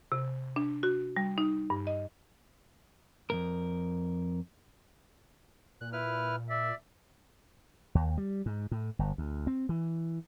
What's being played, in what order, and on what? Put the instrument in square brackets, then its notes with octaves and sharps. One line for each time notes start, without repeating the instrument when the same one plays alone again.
[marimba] C3
D4
F#4
G3
D#4
G2
D#5
[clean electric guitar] F2 G#2 A#4
[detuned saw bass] A#2 [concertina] F#6
[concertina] E4 B4 F6
[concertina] D5 [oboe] E5
[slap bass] D#2
G3
G#2
A2
G1
D2
C4
E3